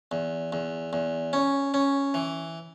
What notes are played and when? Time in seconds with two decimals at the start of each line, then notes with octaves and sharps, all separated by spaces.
0.12 E2
0.53 E2
0.93 E2
1.33 C#4
1.74 C#4
2.14 E3